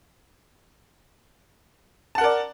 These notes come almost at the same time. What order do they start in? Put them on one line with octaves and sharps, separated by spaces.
A5 F#5 A#4 D5